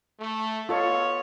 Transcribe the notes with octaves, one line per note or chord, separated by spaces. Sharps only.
A3
B3 F4 A4 C#5 D#5